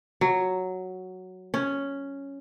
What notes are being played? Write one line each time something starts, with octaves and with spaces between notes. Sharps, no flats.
F#3
C#4